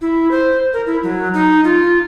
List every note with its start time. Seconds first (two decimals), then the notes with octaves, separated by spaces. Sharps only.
0.01 E4
0.31 C5
0.73 A#4
0.86 E4
1.03 F#3
1.34 D#4
1.64 F4